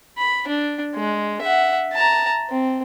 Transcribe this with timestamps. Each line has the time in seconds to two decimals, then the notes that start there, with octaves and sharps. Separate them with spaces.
0.18 B5
0.47 D4
0.95 G#3
1.42 E5 F#5
1.93 A5 A#5
2.50 C4